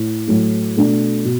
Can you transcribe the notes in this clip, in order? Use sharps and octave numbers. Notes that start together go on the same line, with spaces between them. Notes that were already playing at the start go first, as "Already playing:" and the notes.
Already playing: A2
A2 F#3 A3 E4
B2 A3 D4
B2